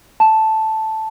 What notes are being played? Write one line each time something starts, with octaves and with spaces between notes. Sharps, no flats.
A5